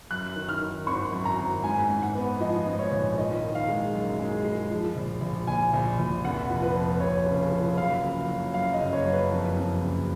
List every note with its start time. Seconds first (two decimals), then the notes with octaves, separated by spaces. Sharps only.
0.11 F#2 F#6
0.36 D#3
0.49 F6
0.61 D#3
0.87 G#1 C#6
1.12 F#2
1.25 A#5
1.39 G#1
1.64 G#2 G#5
1.89 G#2
2.02 F#5
2.15 B3
2.40 F3 D#5
2.67 G#2
2.79 C#5
2.92 A#1
3.18 D#3 D#5
3.43 D#3
3.55 F5
3.68 G#3
3.94 F#2
4.19 G#3
4.45 G#3
4.71 F3
4.96 A#1
5.21 A#1
5.47 A#1 G#5
5.73 A#1
5.99 A#1
6.24 F1 F#5
6.50 F3
6.62 B4
6.75 F2
7.00 F1 C#5
7.26 C#3
7.52 F3
7.77 F#2 F5
8.03 F#1
8.28 F#3
8.54 F#2 F5
8.73 D#5
8.79 F#1
8.93 C#5
9.06 F#2
9.12 B4
9.31 F2
9.57 F2
9.82 F#1